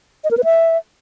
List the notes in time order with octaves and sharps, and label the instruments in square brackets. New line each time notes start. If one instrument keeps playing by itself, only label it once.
[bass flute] D#5
A#4
B4
E5